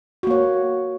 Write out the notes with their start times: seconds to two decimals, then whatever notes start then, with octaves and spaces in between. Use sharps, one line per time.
0.23 F#4
0.27 A#3
0.31 C#5